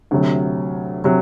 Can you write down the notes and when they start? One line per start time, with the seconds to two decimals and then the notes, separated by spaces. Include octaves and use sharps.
0.11 D2 C3 F#3
1.04 C3 F#3